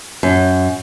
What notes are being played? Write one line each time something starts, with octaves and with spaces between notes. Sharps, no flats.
F#2